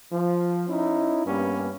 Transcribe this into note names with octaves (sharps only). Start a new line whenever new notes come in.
F3
C#4 D#4 E4
G2 G3 A#3 B3 C#4